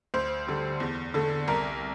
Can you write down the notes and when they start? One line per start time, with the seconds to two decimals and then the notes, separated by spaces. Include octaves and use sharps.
0.14 D2 C5
0.47 D3 G3
0.80 E2
1.14 D3 A3
1.48 C2 A#4